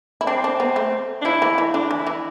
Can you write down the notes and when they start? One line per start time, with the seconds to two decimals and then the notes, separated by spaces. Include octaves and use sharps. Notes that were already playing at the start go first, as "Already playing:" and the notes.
0.21 E4
0.27 C4 D4
0.44 D4
0.60 B3
0.76 A3
1.21 D4
1.25 F3 E4
1.42 E3
1.58 E3
1.74 D3 D4
1.91 E3
1.99 E4
2.07 E3